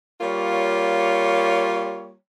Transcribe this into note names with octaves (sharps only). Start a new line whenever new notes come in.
G3 A#3 F4 C#5